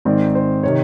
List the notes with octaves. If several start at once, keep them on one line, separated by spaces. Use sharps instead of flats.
G#2 D#3 G#3 C4 D5
C5
C3 D#3 C#5